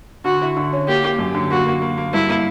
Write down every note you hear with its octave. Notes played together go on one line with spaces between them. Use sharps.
D3 F#4
E4
D3
C#4
A#3 G4
A#3
F#2
D3
A#3 F#4
A#3
A#3
A#3
G2 E4
A#3